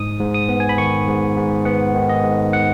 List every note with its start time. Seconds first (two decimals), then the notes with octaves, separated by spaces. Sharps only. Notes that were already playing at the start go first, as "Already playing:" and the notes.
Already playing: G#2 D#6
0.20 G#2
0.34 D#6
0.49 B3
0.60 G#5
0.69 B5
0.78 D#3 C#6
1.08 G#2
1.36 G#2
1.65 B3 F#5
1.94 D#3
2.09 D#5
2.23 G#2
2.53 F#5